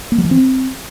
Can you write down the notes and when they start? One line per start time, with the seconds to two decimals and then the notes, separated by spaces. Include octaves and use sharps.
0.12 A#3
0.18 F#3
0.25 E3
0.31 C4